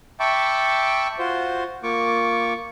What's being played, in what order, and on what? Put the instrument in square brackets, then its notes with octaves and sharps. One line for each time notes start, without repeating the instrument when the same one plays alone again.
[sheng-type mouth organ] E5 G5 A5 B5 C#6 D6
F4 F#4 C5
A#3 F4 C#6 D6